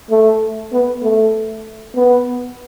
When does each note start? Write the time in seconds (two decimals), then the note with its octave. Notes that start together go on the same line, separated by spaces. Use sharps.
0.11 A3
0.72 B3
1.03 A3
1.95 B3